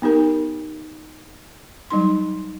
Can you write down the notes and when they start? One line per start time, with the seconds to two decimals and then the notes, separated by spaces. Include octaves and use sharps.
0.02 B3 D#4 G4 A#4
1.90 F#3 G3 D#4 C6